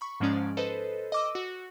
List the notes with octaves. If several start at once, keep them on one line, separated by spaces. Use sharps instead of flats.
B5 C#6
G#2 F3 G#3 C#4 D5
A4 B4 C5 D#5
D#5 D6 E6
F#4